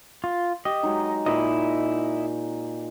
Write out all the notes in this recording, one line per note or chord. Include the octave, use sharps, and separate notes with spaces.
F4
G4 D#5
F#3 G#3 D#4
A#2 D#4 E4 G#4 D#5